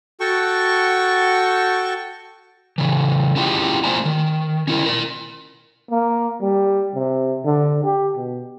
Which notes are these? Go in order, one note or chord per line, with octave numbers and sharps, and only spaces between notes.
F#4 A4 F#5 G5 A5 C#6
C#3 E3
C#4 E4 F4 G4 G#4 G5
A#3 F4 C5 D5 G#5 A#5
D#3
C#4 E4 A#4
A#4 D5
A#3
G3
C3
D3
G4
B2